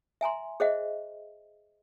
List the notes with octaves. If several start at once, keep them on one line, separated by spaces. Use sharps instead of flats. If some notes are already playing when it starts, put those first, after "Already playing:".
E5 G#5 A#5 C6
G#4 C5 D#5 E5 F#5